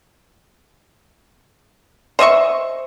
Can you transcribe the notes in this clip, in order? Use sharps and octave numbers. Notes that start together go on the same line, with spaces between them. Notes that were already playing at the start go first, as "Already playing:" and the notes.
C5 D#5 E5 C#6